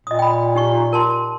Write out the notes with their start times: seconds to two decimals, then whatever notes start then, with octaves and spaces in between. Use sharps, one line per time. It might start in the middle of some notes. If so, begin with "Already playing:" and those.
0.07 A#2 D#5 D#6
0.19 G5 B5
0.55 D#4 G4 C#6
0.93 A#4 A5 C6